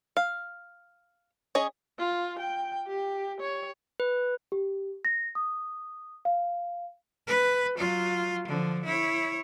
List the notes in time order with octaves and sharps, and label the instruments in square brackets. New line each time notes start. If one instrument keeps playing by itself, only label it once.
[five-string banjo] F5
C#4 G#4 C#5 D#5
[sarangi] F4
G5
G4
C#5
[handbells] B4
[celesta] G4
A#6
D#6
F5
[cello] B4
F#3 F4
D3 F3
E4 C#5